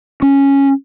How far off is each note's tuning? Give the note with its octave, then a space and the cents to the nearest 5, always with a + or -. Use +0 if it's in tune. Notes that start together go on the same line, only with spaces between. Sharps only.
C#4 -5